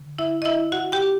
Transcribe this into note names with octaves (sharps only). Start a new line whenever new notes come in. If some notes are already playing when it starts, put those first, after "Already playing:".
Already playing: D3
E4 E5
D#5
E4 E5
F#4 F#5
G4 G5